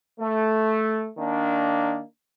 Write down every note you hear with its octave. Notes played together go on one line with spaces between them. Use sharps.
A3
D#3 A#3 D4